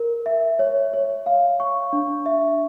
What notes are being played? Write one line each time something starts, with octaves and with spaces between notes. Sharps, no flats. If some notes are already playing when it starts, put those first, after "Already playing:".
Already playing: A#4
E5
C#5
C#5
F5
C#6
D4
E5